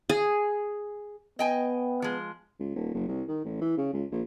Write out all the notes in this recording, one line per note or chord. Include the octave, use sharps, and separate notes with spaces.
G#4
B3 D#5 G5 G#5
F3 G#3
C#2
D#1
F#1
C2
D#3
A1
E3
C#3
C#2
A#1